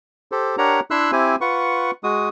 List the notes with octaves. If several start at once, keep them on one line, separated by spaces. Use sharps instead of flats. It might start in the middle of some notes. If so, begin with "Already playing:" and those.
G4 A4 C5
D4 G4 A#4 C#5 F#5 A#5
D4 E4 E5 C6 E6 F#6
C4 E4 G4 C5 G#5
F4 B4 F#5 C#6
G#3 F#4 D#6